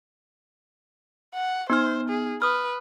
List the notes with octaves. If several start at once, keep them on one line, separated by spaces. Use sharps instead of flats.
F#5
B3 D#4 C5 F6
G#4
B4 D#6 F6